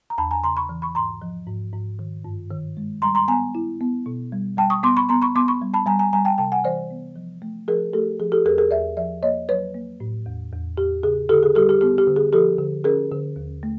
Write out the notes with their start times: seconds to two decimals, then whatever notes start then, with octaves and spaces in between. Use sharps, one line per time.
0.10 A#5
0.18 E2 A5 B5
0.31 G#5 A#5
0.43 C#3 A#5 C6
0.57 B5 C#6
0.69 E3
0.82 B5 C#6
0.95 G#2 A#5 C6
1.22 F3
1.47 G#2
1.73 G#2
1.99 D#3
2.25 G2
2.51 D#3
2.77 G#3
3.02 G3 A#5 C6
3.15 A#5 C6
3.28 B3 G#5 A#5
3.55 E4
3.81 B3
4.06 B2
4.32 G3
4.57 G3 G5 A5
4.70 C#6 D#6
4.83 B3 C6 D6
4.97 B5 C#6
5.09 B3 A#5 C6
5.22 B5 C#6
5.36 B3 C6 D6
5.48 B5 C#6
5.62 G3
5.74 A5 B5
5.86 G3 G#5 A#5
5.99 G#5 A#5
6.13 G3 G#5 A#5
6.25 G5 A5
6.38 C3 G5 A5
6.52 F#5 G#5
6.64 E3 C5 D5
6.90 B3
7.16 F3
7.42 A3
7.68 F3 G#4 A#4
7.93 A3 G4 A4
8.20 F3 G#4
8.32 G4 A4
8.45 E2 G#4 A#4
8.58 G#4 A#4
8.71 E2 D5 E5
8.97 F3 D5 E5
9.23 A#3 C#5 D#5
9.49 F#3 B4 C#5
9.74 A#3
10.00 A2
10.26 E2
10.52 E2
10.77 E2 G4
11.03 C#3 G#4
11.29 D3 G4 A4
11.43 G#4
11.55 G3 G4 A4
11.69 G4
11.81 B3 G4
11.98 G4
12.08 D3
12.16 G#4
12.33 F3 G4 A4
12.58 D3
12.84 C#4 G#4 A#4
13.11 D3
13.36 D#2
13.63 A3